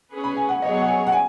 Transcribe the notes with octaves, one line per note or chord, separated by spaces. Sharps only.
C#4 G#4 B4
B5
G#5
F#5
F#3 B3 G#4 C#5 D#5
F#5
G#5
F#5
G#5